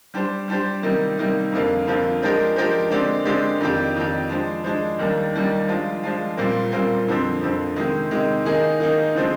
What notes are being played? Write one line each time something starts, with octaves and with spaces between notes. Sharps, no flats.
G3 D4 G4 C5
G3 D4 G4 C5
C3 D#3 G3 A#3 D#4
C3 D#3 G3 A#3 D#4
F2 D3 F3 A#3 F4
F2 D3 F3 A#3 F4
F3 G#3 D4 G4 A#4
F3 G#3 D4 G4 A#4
D3 G#3 C4 G4 D5
D3 G#3 C4 G4 D5
F2 D#3 A#3 D4 G4
F2 D#3 A#3 D4 G4
F3 G#3 D4
F3 G#3 D4
D#2 D#3 G3 A#3 D4
D#2 D#3 G3 A#3 D4
F3 G#3 D4 F4
F3 G#3 D4 F4
A#2 G3 C4 F4 A#4
A#2 G3 C4 F4 A#4
F2 D3 F3 C4
F2 D3 F3 C4
C3 D#3 G#3
C3 D#3 G#3
D#3 A#3 D#4 G#4
D#3 A#3 D#4 G#4
D3 F3 G#3 C4